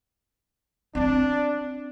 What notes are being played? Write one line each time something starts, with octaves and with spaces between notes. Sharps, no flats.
C4 D4